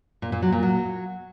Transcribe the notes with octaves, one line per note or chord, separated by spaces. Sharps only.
A#2
A#2
F#3
A#2
F#3